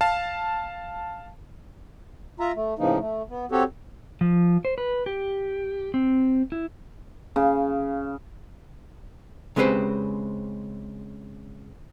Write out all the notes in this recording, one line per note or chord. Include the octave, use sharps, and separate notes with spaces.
F5 A5
F4 E5 A#5
A3
A2 C#3 E3 F3 A#3 D#4
A3
B3
C4 F#4 G4 A4 C#5
F3
C5
B4
G4
C4
E4
C#3
C#3 G#3 C4 G4 B4 C5